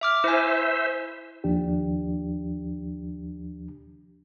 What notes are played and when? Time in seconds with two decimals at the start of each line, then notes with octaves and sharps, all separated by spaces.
0.01 E5 D6 F6
0.24 E4 C5 E5 G#5
1.44 D#2 F3 D4 G4